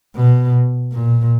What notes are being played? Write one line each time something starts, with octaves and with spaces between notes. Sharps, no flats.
B2
A#2